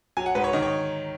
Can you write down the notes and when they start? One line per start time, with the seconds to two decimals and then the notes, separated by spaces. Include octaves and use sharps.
0.17 F#3 G#5
0.26 F#5
0.35 G#2 B4
0.44 C#5
0.53 D#3 D#5
0.62 C#5